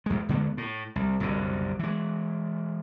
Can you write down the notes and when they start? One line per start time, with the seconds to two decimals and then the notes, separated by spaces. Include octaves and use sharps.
0.06 E2 G#3
0.29 E2 D3 G#3 B3
0.57 A2
0.96 C2
1.20 F#1 C2 F#2 D3
1.79 E3 G#3